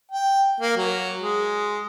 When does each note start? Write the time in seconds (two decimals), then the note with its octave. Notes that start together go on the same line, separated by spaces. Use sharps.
0.12 G5
0.60 A#3
0.77 F#3
1.21 G#3